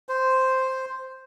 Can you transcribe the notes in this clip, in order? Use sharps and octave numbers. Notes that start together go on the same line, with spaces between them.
C5